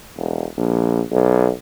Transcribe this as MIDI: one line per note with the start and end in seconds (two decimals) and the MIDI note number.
0.18 0.45 28
0.57 1.01 34
1.12 1.50 35